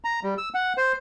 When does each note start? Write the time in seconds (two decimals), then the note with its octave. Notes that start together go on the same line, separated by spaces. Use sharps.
0.04 A#5
0.23 G3
0.38 E6
0.54 F#5
0.77 C5